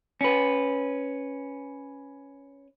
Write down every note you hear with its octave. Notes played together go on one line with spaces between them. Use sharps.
C#4 B4